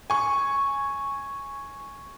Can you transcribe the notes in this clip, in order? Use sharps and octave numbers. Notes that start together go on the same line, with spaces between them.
G#5 C#6